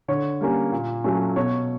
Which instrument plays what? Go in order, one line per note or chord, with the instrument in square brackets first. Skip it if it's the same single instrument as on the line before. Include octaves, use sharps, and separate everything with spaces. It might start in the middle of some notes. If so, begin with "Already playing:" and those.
[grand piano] D3 C#5
G3 A#3 C#4
A#2
F#3 A3 C#4
B2 C#5